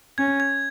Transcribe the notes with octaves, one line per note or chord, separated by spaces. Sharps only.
C#4 G#6
G#6